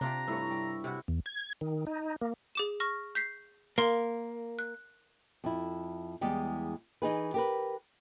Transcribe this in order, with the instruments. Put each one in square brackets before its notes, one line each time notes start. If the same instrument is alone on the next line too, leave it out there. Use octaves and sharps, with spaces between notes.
[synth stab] C3 [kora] D4 F4 G4 [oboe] A#5
[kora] G2 A3 [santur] E4 C#5
[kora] G3
C3 E4 F#4
[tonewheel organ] E2
G#6
D#3
D#4
A#3
[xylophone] G#4 D6 E7
C#6 F6 A#6
G6 B6 C7
[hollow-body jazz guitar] A#3 [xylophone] A#4 F5 C6
[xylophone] F#6
[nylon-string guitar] F2 E4
E2 G3 G#3 G4
E3 D#4 G#4 B4
G4 A#4 B4